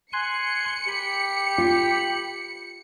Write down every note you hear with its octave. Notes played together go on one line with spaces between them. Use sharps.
G#5 C6 F#6 C#7
G4 B5
F4